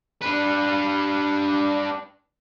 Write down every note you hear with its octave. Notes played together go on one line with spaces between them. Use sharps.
D4 B4